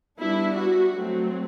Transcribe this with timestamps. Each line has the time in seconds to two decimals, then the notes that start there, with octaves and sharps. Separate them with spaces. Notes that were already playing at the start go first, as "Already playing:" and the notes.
0.19 G3 B3 D4 E4
0.55 F#4
0.92 F#3 A3 C4